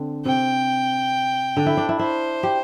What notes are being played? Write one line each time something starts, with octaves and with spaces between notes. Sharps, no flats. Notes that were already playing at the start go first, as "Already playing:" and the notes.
Already playing: D3 C4
C3 G5
D3
E4
D4
E4
E4 C5
G4